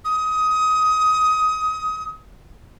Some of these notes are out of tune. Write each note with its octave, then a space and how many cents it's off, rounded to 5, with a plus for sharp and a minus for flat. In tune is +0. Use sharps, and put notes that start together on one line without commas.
D#6 +20